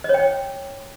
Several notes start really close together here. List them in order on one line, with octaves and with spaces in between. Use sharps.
D#5 C#5 G5